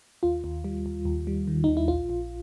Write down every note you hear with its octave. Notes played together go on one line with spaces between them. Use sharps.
D#2 F4
D#2
G3
D#2
D#2
G3
D#3
D#2 D#4
E4
A#1 F4
A#1